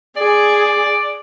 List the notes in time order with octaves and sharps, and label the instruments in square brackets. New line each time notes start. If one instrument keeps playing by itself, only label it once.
[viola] G#4 [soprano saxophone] D5